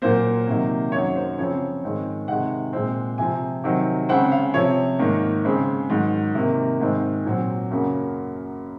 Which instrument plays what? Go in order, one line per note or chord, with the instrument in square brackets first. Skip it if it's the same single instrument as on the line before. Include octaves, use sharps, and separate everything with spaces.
[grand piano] A#2 F#3 A#3 C5
C3 D#3 F#3 A#3
F#2 D#3 F#3 C#5
C5
C#3 F3 C4 C#5
G#2 D#3 G#3 C4
C3 D#3 G#3 F#5
A#2 G#3 C4
C3 F3 C4 G#5
C3 D#3 F#3 C4
C#3 G#3 C4 F#5
F5
C3 F3 C4 C#5
G#2 D#3 A#3
C#3 G#3 C4
G#2 D#3 F#3
C3 D#3 A#3
G#2 D#3 G#3 C4
A#2 F#3 C4
F#2 C#3 F#3 A#3